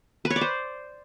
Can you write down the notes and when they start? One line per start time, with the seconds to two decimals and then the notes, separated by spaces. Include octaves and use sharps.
0.25 B4
0.30 C#5
0.36 D5
0.41 C5